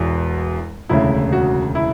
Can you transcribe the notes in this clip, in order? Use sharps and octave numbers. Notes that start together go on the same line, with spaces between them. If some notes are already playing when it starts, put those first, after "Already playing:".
Already playing: E1 E2 B2
E1 D2 C#3 E4
F#4
E4